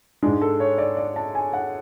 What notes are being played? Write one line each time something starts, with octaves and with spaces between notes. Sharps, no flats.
G#2 G#3 D4
A4
C#5
D5
D5
A5
G#5
F#5